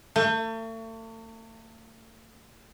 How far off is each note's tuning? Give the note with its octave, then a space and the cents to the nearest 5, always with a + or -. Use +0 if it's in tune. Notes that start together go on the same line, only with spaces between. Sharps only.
A3 +40